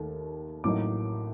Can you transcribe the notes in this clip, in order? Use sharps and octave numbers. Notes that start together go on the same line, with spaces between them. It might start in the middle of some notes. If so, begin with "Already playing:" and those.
Already playing: D#2 D#3 A3
A1 A2 F#3 A#3 D#4 D6